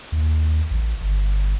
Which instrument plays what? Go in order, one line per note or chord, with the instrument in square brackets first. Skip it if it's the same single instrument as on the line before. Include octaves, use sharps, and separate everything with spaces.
[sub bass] D#2
A1
G1